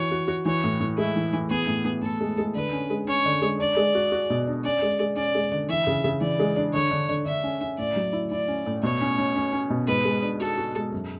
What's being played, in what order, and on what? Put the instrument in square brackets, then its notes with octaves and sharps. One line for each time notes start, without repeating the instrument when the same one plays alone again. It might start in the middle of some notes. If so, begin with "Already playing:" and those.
Already playing: [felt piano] E3 F#4 [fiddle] C#5
[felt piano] F#4
F#4
[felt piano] E3 [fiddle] C#5
[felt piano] A2
A2
[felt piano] G#3 [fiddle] E4
[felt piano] E3
E3
[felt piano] B3 [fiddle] G#4
[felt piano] A2
B3
[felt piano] A2 [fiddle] A4
[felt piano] G#3
G#3
[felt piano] D3 [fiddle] B4
[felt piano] C#4
G#3
[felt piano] C#4 [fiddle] C#5
[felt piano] D3
G#3
[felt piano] D4 [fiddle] D5
[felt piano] G#3
F#4
F#4
B2
D4
[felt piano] C#4 [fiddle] D5
[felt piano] G#3
G#3
[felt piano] C#4 [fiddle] D5
[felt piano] G#3
D3
[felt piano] E3 [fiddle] E5
[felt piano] C#3
C#3
[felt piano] E3 [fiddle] D5
[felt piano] G#3
D4
[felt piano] D3 [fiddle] C#5
[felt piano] D3
D3
[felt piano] D3 [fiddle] E5
[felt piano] C#4
C#4
[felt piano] A2 [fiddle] D5
[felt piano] F#3
E4
[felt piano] E4 [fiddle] D5
[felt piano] C#4
A2
[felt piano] B2 [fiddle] C#5
[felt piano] C#4
C#4
C#4
C#4
B2
[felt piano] G#2 [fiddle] B4
[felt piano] G#3
D4
[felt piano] F#4 [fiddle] A4
[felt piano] F#4
G#3
F#2